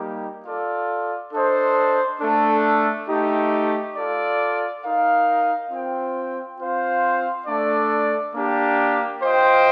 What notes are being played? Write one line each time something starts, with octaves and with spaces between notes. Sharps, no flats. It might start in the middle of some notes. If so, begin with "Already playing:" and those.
Already playing: G3 A#3 D#4 G4
F4 A4 D5
D4 A4 C5 D#5
A3 D4 A4
A3 D#4 G4
F4 A4 D5
D#4 A#4 F5
C4 F4 C5 G5
C4 F4 C5 F5
A3 D4 A4 D5
A#3 D4 G4
F4 C5 D#5 G5